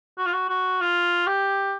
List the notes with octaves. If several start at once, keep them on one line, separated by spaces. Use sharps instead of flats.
F#4
F4
F#4
F#4
F4
G4